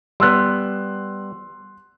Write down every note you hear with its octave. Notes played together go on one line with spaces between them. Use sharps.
G3 B3 C6 E6 F#6